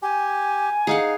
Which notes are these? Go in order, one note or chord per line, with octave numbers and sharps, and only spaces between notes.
G4 G#5
D#4 G#4 F5 F#5